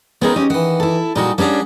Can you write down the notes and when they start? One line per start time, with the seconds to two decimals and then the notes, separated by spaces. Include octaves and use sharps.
0.22 C#3 B3 C4 D#4 G#4 A#4
0.36 C#4 G4 D#5
0.50 D#3 E3 F#5
0.80 E4 A4
1.16 A#2 G3 G#3 D#4 F#4
1.38 G3 A#3 C#4 D4 G#4 F#5